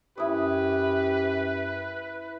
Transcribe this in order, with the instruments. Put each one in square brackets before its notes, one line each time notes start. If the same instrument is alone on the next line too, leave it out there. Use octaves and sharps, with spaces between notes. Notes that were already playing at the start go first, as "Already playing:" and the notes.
[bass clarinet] F#2 [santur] E4 D#6 [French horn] G4 [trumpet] B4